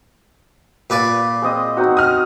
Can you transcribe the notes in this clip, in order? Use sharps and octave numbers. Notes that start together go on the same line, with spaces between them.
A#2 B4 D5
G#3 C4 D#5
C4 D#4 F#4
D#6 F6